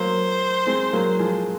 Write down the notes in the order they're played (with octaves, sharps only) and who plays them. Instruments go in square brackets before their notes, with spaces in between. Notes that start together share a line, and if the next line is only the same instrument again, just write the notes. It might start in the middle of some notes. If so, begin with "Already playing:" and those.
Already playing: [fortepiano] F#3 A#3 [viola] C5
[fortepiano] G#3 C4
F#3 A#3
F3 G#3